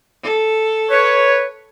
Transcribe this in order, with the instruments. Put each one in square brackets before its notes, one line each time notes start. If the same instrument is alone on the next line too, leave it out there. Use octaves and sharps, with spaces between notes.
[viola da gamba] A4
[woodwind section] B4 C#5